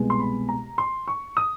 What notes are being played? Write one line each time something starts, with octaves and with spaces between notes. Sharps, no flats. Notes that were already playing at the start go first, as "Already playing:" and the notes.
Already playing: C2 B2 G#3 B3
C6
B5
A#5
C6
C#6
D#6